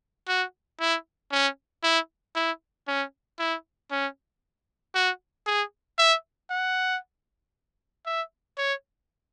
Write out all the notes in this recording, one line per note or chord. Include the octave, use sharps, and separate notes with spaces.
F#4
E4
C#4
E4
E4
C#4
E4
C#4
F#4
G#4
E5
F#5
E5
C#5